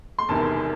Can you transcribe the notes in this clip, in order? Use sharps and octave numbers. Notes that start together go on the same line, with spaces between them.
C6
E1 E2 C3 D#3 A5